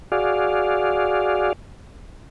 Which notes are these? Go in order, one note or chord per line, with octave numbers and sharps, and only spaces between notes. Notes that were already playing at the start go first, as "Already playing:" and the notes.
F#4 G#4 D5 F5